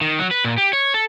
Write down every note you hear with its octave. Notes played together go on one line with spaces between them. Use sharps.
D#3
F#3
B4
A#2
G4
C#5
A4